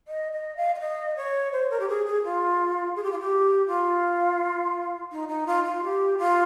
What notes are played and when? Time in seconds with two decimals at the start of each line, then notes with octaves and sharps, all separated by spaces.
0.08 D#5
0.32 D#5
0.57 F5
0.75 F5
0.80 D#5
1.17 C#5
1.53 C5
1.70 A#4
1.80 G4
1.88 G#4
2.06 G#4
2.24 F4
2.96 G#4
3.03 G4
3.12 F4
3.20 G4
3.67 F4
5.12 D#4
5.28 D#4
5.47 F4
5.64 F4
5.83 G4
6.18 F4